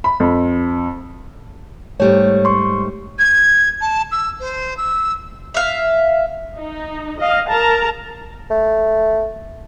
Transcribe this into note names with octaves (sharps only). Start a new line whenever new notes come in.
B5
F2
G#2 G3 A3 C#5
C6 C#6
G#6
A5
E6
C5
E6
E5 F5
D#4
D#5 F5
A#4 A5 A#5
A3